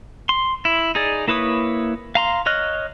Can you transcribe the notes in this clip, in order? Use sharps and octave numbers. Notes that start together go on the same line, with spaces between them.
C6
E4
D#4 G#4 D5
A#3 E4 B4 C#5 D#6
F5 A#5 C6
C#5 D#5 F6 F#6